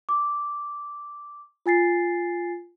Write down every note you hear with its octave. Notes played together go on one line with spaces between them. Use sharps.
D6
F4 G#5 A6 C7